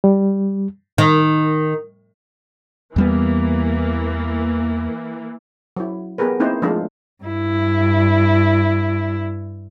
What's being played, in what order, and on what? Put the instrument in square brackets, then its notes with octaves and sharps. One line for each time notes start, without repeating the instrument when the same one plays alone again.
[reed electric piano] G3
[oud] D#3
[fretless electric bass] E2 G3 B3 [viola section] E3 A#3
[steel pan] F#3 E4
B3 G4 G#4 A#4 B4
A#3 C4 D#4 E4 C5
F3 G#3 A3 D4 F4
[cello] G2 E4